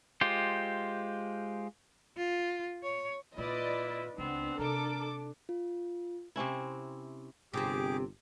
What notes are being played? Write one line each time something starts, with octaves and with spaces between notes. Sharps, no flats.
G#3 F4 G4 C5
F4
C#5
A#2 E4 F4 B4 D5 D#5
C#2 B3 C4 D4
C3 A4 A#4 D6
F4
C3 C4 C#4 E4
G1 C3 C4 G4 G#4 D6